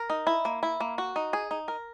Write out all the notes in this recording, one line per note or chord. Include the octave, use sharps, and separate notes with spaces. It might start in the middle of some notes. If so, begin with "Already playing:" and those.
Already playing: A#4
D#4
E4
A#3
E4
A#3
F#4
D#4
G#4
D#4
A#4